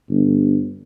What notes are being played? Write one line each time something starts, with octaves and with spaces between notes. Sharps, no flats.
G1